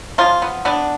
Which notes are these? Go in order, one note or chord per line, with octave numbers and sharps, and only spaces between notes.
F3 F4
B3
B3 D4